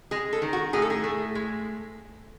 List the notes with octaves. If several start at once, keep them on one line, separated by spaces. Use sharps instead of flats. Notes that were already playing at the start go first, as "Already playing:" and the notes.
G#3 G#4
A4
D#3
F#4
A2 G#4
A4
G#4
A3
G#3